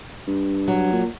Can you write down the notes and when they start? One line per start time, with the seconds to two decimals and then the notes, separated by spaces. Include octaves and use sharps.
0.28 G2
0.68 F#3
0.93 A#2